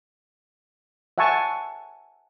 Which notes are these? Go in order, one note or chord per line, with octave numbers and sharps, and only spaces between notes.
E5 F#5 G#5 A5 C#6